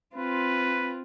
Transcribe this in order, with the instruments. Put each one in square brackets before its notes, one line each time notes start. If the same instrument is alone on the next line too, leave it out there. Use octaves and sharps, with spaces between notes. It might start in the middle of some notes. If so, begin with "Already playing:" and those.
[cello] C4 F4 [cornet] B4